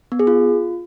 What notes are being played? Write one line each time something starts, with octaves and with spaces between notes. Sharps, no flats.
B3
G#4
F4